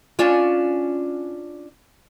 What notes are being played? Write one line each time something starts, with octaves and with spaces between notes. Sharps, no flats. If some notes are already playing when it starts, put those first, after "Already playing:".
C#4 D4 F4